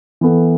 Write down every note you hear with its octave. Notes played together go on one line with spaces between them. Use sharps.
E3 B3 E4 A4